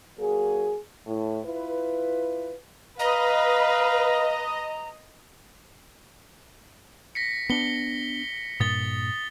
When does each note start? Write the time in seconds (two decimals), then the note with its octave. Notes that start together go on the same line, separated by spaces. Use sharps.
0.19 F#3 A#3 G#4
1.07 A2
1.45 E4 F4 B4
2.99 B4 D#5 F5 A#5
7.15 A#6 B6 C#7
7.50 B3 D4 C#7 G7
8.60 G2 A#2 D#6 A6 G7